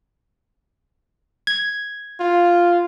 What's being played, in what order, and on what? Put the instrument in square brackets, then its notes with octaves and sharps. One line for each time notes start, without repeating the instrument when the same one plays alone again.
[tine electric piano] G#6
[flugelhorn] F4